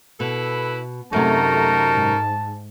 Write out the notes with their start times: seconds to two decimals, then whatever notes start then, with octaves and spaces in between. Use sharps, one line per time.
0.20 B2 E4 A4 B4
1.13 F#2 C3 A3 D#4 F#4 A#4 A5
1.91 G#2